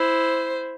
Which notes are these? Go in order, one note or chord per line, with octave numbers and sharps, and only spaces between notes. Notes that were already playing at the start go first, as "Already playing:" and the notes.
Already playing: E4 C5